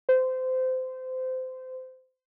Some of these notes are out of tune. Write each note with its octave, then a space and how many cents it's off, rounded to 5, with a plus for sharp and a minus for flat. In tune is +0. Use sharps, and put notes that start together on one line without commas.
C5 -25